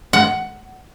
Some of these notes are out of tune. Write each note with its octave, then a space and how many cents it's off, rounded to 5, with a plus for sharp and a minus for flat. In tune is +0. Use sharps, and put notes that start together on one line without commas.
F#5 +15